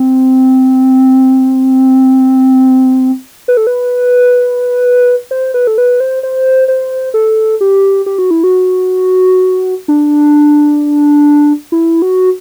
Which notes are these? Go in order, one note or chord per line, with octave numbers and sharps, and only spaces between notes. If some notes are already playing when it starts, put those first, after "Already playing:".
Already playing: C4
B4
A4
B4
C5
B4
A4
B4
C5
C5
C5
A4
G4
G4
F#4
E4
F#4
D4
E4
F#4